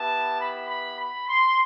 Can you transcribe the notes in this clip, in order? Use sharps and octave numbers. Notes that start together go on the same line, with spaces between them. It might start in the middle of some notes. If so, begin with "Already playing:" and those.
Already playing: B3 E4 G4 A5
B5
B5
B5
C6